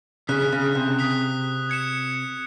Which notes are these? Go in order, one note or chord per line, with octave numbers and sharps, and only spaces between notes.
C#3 D#6 F#6 B6
C#3
C3
D#6 F#6 B6
G#6 C#7 E7